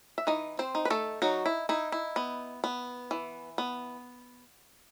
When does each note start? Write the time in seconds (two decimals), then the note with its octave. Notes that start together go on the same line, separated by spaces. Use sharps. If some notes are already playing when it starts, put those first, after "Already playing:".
0.18 E5
0.27 E3 D#4 D#5
0.59 C4 C5
0.75 D#4
0.85 B4
0.90 A3 A4
1.22 F#3 D#4 F#4
1.46 E4
1.69 D#4 E4
1.92 E4
2.16 B3
2.64 B3
3.11 E3
3.58 B3